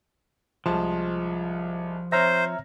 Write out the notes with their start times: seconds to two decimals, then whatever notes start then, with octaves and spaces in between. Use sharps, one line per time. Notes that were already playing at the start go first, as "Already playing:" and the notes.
0.66 C2 F3 G#3 A5
2.12 C4 C5 C#5 E5 A#5 F6 A#6